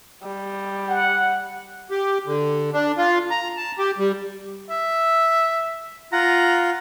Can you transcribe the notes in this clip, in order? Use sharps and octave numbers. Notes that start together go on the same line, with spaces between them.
G3
F#5
G4
D3
D4
F4
A#5
A5
G4
G3
E5
F4 F#5 A#5